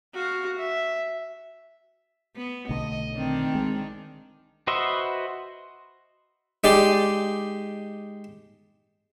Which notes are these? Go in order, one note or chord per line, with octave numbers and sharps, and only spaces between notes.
F#4 F5
E5
B3
B1 D3 A3 D#5
D#3 C4 D4
G#3
F#4 B4 C5 D#5 E5
G#3 D#4 G4 D5